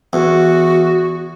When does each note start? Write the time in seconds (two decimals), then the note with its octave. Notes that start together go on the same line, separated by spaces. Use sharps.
0.13 E2 F#4